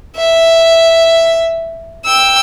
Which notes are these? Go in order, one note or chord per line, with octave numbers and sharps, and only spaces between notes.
E5
G5 E6